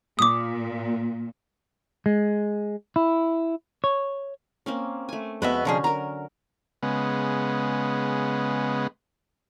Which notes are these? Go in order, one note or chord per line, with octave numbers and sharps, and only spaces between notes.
A#2 D6 D#6
G#3
E4
C#5
A#3 C4 C#4
A3 G#5
F2 G#3 B3 F#4 B4 E5
C2 D3 F3 C#4 G#4
F#3 A#4 A#5
C#3 G#3 B3